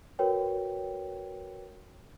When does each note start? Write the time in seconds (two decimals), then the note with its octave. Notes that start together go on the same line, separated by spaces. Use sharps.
0.19 F#4 A#4 B4 C#5 G5